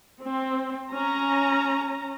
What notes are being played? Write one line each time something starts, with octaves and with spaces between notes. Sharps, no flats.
C4
C#4 A#5